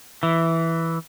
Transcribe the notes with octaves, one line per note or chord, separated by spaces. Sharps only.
E3